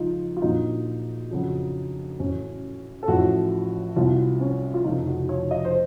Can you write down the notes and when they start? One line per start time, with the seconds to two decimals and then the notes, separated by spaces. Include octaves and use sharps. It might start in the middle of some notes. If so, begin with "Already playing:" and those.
Already playing: C#2 C#3 F3 D#4 F4
0.37 F4
0.42 A#1 A#2 F#3 D#4
1.31 F2 C#3 F#3
2.19 A1 A2 F#3 C#4
3.03 A4
3.08 A1 A2 F3 F#4
3.96 C2 C3 F#3 F4
4.40 C#4
4.74 F4
4.84 F1 F2 C#3 F3 D#4
5.07 F#4
5.29 C#5
5.51 D#5
5.65 C5